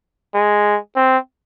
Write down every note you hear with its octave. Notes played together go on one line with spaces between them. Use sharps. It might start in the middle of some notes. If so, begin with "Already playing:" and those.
G#3
C4